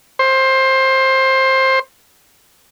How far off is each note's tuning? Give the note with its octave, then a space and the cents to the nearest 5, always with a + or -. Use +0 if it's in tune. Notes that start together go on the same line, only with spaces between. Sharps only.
C5 +20